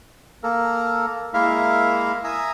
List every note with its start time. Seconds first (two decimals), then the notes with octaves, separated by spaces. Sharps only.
0.43 A#3 A4 A#4
1.34 G#3 A#3 E4 A#4 E5 F5
2.24 E5 G#5 A#5 D#6 E6